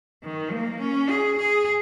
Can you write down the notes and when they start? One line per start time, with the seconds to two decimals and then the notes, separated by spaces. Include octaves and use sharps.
0.24 D#3
0.53 A#3
0.81 C#4
1.10 G#4
1.38 G#4